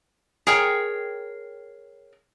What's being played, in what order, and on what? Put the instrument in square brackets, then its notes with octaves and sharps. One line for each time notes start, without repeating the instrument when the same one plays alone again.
[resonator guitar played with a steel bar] G#4 A#4 C#5 G5